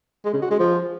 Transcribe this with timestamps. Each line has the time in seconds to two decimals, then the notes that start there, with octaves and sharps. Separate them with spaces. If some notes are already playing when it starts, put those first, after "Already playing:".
0.25 G#3
0.33 C#3
0.42 F#4
0.51 G#3
0.59 F3